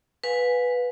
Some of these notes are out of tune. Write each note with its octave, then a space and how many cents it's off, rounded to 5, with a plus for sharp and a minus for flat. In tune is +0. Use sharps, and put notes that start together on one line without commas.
B4 +0 F5 +35 G#5 -10